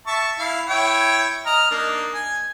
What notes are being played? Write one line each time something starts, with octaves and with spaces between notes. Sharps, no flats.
E5 A5 C#6
E4 F5
E4 C#5 G5
D#5 A#5 F6
A#3 D4 D#4
G#5